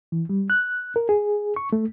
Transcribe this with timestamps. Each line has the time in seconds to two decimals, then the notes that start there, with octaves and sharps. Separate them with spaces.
0.12 E3
0.29 G3
0.50 F#6
0.96 A#4
1.09 G#4
1.56 C#6
1.73 A3